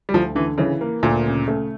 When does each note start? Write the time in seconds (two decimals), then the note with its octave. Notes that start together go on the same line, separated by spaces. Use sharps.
0.09 G3
0.14 D2 F3
0.35 D3 E3
0.58 C#3 E3
0.81 A#3
1.03 D2 A#2
1.26 C#3
1.48 A3